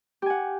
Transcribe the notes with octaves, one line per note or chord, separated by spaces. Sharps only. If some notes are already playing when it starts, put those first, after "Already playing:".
G4 F#5 G#5